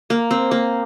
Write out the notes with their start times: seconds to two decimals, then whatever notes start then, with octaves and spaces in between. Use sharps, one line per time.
0.10 A#3
0.31 C4
0.51 A#3